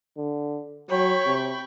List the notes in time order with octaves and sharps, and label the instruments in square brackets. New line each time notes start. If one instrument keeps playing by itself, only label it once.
[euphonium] D3
[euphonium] F#3 [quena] C#5 [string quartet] G5 B5 C#6
[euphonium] C3